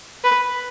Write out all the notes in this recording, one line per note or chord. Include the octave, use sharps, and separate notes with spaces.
B4